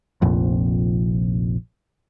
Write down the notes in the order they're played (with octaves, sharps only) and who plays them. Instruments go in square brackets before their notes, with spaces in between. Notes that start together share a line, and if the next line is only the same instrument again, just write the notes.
[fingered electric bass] F1 A#1 F2